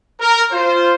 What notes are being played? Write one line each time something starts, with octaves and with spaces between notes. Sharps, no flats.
A#4
F4 C5